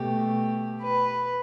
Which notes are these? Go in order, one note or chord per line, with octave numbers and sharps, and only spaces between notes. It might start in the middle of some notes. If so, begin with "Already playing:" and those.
Already playing: B2 A3 G4
B4